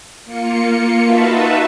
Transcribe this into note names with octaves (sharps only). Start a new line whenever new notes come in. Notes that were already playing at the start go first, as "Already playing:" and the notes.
A#3 F4 C#7
D#4 F4 F#4 B4 E5 A5